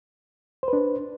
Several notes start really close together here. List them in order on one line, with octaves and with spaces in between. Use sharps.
C5 B4 D4